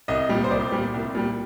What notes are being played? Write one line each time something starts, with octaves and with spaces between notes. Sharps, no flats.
C2 D#5
A#2 G3
C5
C2 D5
A#2 G3
C2
A#2 G3